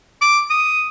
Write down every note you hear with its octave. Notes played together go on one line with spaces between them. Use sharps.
D6
D#6